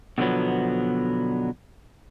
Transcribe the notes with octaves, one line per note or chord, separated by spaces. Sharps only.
B2 D3 F3 F#3 B3